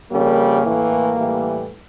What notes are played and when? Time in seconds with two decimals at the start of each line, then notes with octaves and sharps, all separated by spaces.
0.11 F2 C#3 G3 A#3
0.63 A2 E3 A3
1.16 A2 E3 G3